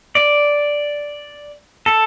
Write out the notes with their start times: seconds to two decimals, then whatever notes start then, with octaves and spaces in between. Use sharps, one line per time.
0.15 D5
1.86 A4